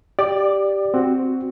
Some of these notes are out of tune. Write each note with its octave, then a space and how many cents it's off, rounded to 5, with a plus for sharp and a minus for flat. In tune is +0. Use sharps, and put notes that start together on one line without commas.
G4 +0 D5 +0 D6 +30
C4 +0 F#4 +0